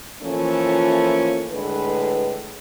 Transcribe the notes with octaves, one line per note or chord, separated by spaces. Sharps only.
E3 F3 A3 A#3 C#4 F4
A2 D3 G#3 B4